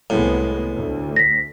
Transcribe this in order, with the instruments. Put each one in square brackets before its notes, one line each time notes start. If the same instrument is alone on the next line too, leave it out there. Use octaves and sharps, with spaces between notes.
[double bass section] C2 G#3 B3 [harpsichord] A2
[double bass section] D2
[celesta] A#6 B6